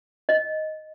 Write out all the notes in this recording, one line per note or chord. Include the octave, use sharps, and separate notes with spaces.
D#5